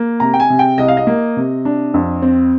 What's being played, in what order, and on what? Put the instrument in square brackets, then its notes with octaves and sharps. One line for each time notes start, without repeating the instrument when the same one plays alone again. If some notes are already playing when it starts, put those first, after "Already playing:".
Already playing: [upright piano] A#3
C3 A#5
G5
G#5
C3
G5
C2 D#5
F5
D#5
A#3
C3
D4
F2
C4